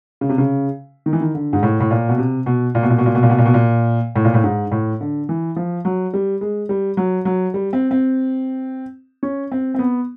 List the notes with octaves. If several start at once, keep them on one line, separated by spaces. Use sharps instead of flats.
C#3
C3
C#3
D#3
E3
D#3
D3
G#2
A2
A2
A#2
B2
C3
B2
A#2
B2
A#2
B2
A#2
B2
A#2
B2
A#2
B2
A#2
A2
A#2
A2
G#2
A2
D3
E3
F3
F#3
G3
G#3
G3
F#3
F#3
G3
C4
C4
C#4
C4
C4
B3